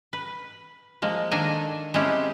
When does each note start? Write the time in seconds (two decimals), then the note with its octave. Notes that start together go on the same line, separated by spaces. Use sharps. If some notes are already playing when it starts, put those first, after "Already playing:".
0.13 B4
1.02 F3 G#3 A#3
1.31 D#3 D4 A4 G#5 A#5
1.94 G#3 A3 C4 C#4 E4 G4